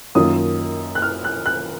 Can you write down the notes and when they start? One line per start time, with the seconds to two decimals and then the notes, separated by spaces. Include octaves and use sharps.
0.15 F#2 D#3 A#3 F4 D#6
0.95 F#6
1.02 F6
1.24 F#6
1.46 F#6